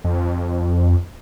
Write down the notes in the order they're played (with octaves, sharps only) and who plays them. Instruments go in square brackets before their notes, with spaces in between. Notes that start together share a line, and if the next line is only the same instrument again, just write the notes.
[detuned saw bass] F2